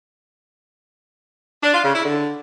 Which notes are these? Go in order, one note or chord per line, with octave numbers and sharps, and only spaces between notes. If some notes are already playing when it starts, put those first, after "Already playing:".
D4
F4
C#3
E4
D3